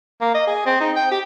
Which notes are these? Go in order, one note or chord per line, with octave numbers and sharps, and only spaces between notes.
A#3
D#5
G#4
C4
D#4
G5
G4